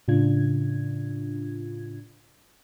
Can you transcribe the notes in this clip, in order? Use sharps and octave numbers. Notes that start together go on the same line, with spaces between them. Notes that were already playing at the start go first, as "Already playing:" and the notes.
A2 C#3 D4 F4 G#6